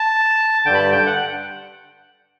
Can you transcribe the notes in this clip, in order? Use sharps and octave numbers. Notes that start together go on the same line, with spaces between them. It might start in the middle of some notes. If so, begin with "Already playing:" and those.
Already playing: A5
G2 D3 G5
B5
A5
G5
F#5